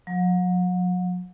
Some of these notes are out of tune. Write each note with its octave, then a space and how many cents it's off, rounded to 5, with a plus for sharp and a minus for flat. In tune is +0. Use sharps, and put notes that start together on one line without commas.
F#3 -40